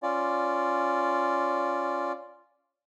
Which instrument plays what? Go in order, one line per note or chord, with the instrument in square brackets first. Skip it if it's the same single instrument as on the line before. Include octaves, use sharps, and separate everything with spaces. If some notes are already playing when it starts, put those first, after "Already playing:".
[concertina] C#4 F4 D5